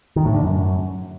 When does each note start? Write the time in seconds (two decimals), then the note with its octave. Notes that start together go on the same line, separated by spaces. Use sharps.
0.16 D#3
0.25 A2
0.34 D3
0.43 F#2